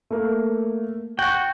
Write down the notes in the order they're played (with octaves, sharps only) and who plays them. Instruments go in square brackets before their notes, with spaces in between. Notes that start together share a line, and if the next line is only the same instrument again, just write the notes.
[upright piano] A3 A#3
[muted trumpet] F#4 [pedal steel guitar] G5 [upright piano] F#7